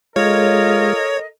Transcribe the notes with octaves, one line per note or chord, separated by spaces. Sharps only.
G#3 F4 A4 A#4 C#5 D#5